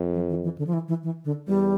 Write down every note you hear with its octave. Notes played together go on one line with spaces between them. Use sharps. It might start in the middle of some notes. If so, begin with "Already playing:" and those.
Already playing: F2
F3
E3
E3
D3
F3
E3
E3
E3
D3
E2 G3